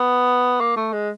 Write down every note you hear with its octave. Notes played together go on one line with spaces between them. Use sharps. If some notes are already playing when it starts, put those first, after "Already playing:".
Already playing: B3
A#3
A3
G#3